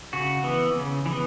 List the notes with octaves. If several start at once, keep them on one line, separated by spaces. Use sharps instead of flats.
C#3 F#4
E3 B3
C#3
E3 B3